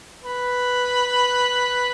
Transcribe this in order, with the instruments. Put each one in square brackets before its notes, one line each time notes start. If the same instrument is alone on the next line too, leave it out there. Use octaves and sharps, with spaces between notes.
[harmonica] B4